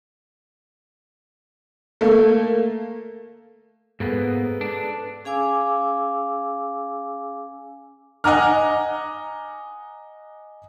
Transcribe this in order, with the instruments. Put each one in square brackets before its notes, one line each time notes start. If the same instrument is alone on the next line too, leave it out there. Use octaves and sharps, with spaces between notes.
[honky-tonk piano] A3 A#3
[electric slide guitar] G#2 A#3 B3 [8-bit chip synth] G#4 A4 B4
[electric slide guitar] D4
[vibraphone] C#4 G#4 F5 G#5 D6 E6
[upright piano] D#5 F#5 G#5 A#5 D6 F6